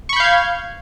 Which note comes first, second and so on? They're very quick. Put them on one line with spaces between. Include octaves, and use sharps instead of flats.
C#6 B5 G6 F5 G#6